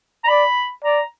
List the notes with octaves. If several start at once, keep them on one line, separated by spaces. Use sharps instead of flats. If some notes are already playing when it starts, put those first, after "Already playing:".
A#5
D5 B5
D5 A#5